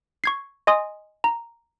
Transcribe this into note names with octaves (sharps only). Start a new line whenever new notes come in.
C#6 G#6 C7
D#5 G#5 C6 D#6
A#5